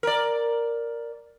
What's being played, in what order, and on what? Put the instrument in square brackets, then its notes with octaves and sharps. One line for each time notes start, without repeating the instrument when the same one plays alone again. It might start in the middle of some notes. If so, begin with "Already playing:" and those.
[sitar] A#4 D5